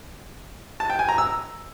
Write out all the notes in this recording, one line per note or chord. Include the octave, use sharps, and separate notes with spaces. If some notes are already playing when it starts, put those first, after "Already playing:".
A5
G5
G#5
A#5
E6